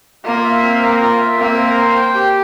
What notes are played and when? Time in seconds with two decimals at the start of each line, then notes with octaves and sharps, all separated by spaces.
0.25 A#3 F4
0.44 E5
0.62 C4
0.81 A#4
1.02 F4
1.20 E5
1.39 A#3 C4
1.58 A#4
1.77 C5
1.96 G5
2.15 G4